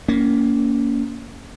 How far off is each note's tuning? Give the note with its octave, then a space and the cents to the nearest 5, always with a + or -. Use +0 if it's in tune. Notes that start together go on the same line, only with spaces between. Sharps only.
A#3 +0 C#4 +30